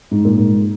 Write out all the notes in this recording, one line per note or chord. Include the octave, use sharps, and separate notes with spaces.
G#2
A#2
G#2